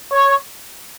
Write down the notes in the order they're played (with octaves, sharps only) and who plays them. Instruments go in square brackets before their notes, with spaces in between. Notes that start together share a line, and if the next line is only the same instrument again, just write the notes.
[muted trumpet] C#5 [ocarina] C#6